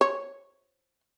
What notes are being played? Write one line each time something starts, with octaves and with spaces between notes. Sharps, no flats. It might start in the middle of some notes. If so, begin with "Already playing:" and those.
C#5